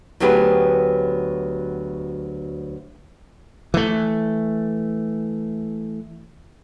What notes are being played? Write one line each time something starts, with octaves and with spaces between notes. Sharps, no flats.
D2 F#3 B3 G4 G#4 B4
E3 A3